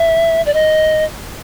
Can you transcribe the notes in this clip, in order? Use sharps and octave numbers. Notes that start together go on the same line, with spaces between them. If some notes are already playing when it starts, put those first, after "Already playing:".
Already playing: E5
D5
D#5